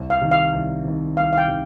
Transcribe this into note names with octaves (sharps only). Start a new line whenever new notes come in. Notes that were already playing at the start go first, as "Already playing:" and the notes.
Already playing: C2
F5
C3 D#3
F5
C2
C3 D#3
C2 F5
F5
G5
C3 D#3